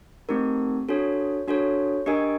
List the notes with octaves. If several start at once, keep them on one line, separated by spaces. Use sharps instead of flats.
A3 C4 D#4 G4 A#4
D4 F#4 A4 C#5
D4 F#4 A4 C#5
D4 G4 A#4 D#5 G#5